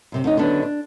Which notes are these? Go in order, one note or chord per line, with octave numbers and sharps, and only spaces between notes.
F#2 C3 C4
D2 C#4 D#4
D3 D#3 F#3 B3 C#4 D4
D4